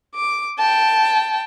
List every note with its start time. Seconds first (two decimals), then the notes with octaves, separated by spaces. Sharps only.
0.15 D6
0.59 G5 A5